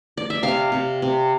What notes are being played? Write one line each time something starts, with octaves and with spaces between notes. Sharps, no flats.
D5
E5
C3 F5
C3
C3